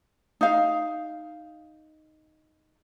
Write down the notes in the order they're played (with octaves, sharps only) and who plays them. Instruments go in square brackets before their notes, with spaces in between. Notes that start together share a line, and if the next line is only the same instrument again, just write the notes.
[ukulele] D#4 F5